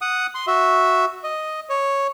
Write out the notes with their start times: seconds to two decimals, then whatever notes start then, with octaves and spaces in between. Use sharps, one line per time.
0.02 F#5 D#6
0.35 C6
0.47 F#4 E5
1.24 D#5
1.69 C#5